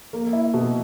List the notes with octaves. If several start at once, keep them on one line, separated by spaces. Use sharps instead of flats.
A#3
E4
B2